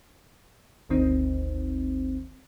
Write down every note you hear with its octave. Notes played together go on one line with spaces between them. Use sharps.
G1 D2 D#3 C4 D#4